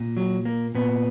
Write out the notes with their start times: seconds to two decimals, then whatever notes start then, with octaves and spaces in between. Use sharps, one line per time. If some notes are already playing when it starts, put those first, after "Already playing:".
Already playing: A#2
0.17 F#3
0.45 A#3
0.75 A#2 B3